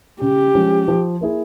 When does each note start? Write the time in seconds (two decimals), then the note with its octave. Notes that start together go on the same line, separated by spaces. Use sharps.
0.21 C#3 G4
0.55 F3 G#3 C#4
0.88 F3
1.21 A#3 E4 G#4